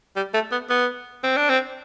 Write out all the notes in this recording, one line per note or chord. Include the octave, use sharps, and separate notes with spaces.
G3
A3
B3
B3
C4
D4
C4